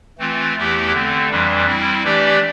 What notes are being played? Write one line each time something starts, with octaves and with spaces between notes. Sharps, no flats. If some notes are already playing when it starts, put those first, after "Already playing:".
E3 A3 C4 F4
E2 E3 A3 E4 G4
D3 A3 C4
F2 E3 G3 D4
G3 C4 E4
E3 A3 D4 G4 D5